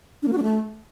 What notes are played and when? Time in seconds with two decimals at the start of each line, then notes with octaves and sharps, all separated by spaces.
0.23 D4
0.28 A#3
0.33 F#4
0.38 D4
0.43 A3